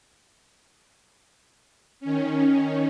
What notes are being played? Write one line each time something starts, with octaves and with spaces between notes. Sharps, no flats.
D#3 C#4